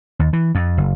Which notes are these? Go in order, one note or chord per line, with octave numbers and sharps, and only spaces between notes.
D#2
E3
F2
F#1